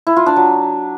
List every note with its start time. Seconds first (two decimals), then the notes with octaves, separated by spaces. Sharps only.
0.07 E4
0.16 F4
0.26 D4
0.36 F#3